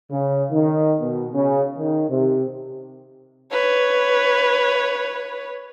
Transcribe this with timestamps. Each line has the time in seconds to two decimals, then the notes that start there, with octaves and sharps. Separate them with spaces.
0.11 C#3
0.51 D#3
1.00 B2
1.34 C#3
1.78 D#3
2.09 C3
3.52 B4 C#5